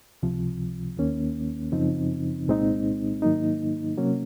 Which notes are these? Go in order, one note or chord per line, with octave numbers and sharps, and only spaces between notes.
C#2 C3 F3
D#2 D#3 A#3 C#4
F#2 C#3 F3 C4 D#4
C2 A#2 G#3 C4 D#4
G#2 D#3 F#3 A#3 D#4
C3 F#3 A#3 C#4